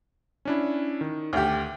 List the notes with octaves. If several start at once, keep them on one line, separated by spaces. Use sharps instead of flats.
C#4 D4 E4
D#3
D2 G4 F6 G6